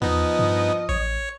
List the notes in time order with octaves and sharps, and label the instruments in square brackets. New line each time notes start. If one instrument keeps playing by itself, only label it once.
[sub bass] E2 [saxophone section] F3 D#5 [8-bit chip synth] B3 D#4
[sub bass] G2
[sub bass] A1 [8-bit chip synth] C#5